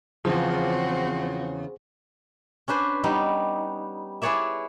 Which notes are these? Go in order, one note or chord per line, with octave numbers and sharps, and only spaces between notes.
E2 G2 C#3 F3 C4 F#4 G#4 C5
C#4 D4 B4 C5
G3 B3 D#4
E4 G#4 B4 C#5 D5 E5